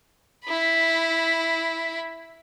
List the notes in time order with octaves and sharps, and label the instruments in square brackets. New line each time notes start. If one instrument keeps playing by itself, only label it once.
[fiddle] E4 B5